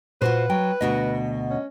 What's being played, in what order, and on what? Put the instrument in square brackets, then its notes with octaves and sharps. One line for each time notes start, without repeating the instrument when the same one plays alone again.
[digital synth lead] A#2 [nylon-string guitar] F4 F#4 C5 [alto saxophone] B4
[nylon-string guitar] F#3 [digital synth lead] G5
[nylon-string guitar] D2 B2 F#4 [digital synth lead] D#5
[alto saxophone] C#4